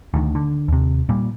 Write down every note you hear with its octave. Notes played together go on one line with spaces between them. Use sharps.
D2 D#3
D3
D#2 C3
A#2 G3